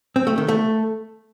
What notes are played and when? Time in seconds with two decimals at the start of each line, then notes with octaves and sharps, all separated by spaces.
0.16 C4
0.27 A3
0.38 D#3
0.48 A3